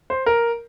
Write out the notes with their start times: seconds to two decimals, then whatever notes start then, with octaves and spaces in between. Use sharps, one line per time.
0.10 C5
0.26 A#4